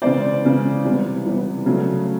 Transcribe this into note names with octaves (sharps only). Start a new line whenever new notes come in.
C#3 E3 G#3 B3 C5 D5
C#3 E3 G#3 B3
C3 E3 G3 B3
C3 E3 G3 B3
C#3 F#3 A3